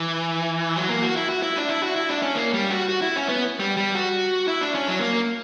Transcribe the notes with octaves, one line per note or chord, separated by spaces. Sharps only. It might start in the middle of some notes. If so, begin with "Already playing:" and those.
Already playing: E3
F#3
A#3
F#4
E4
F#4
E4
D4
E4
F#4
E4
D4
C#4
A#3
G3
F#4
F#4
E4
C#4
B3
G3
G3
F#4
E4
D4
C#4
F#3
A#3